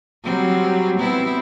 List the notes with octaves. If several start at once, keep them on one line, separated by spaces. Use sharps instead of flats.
F#3 G3 C4
B3 C4 E4